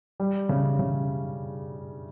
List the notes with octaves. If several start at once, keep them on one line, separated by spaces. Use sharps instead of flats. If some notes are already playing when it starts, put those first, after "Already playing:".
G3
C#3
C#3